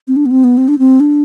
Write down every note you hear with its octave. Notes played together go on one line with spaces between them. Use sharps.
C4
D4
B3
C4
B3
C4
D4
C4
D4